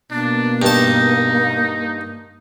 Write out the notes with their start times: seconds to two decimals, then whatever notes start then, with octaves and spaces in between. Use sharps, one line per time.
0.11 B2 A#3 D4
0.62 G2 D#4 A5